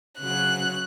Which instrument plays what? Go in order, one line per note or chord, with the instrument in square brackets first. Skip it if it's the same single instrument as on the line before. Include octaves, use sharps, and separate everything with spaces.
[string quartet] C#3 F#3 F#6